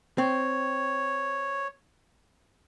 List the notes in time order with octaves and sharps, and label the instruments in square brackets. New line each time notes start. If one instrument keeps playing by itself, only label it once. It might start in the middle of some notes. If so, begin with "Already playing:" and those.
[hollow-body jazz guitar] C4 [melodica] C#5